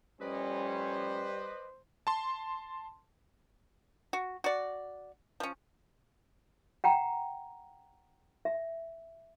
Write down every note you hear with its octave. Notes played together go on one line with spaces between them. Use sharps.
A2 F3 G3 C#4 B4 C5 D5 D#5
A5 C6
F#4
F#4 D5
F3 C#4
F#5 G5 A#5
E5